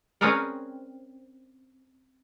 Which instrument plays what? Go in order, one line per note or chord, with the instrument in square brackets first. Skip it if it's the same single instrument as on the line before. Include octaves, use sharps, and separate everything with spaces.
[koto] C4 C#4 G#4 A#4 B4 D5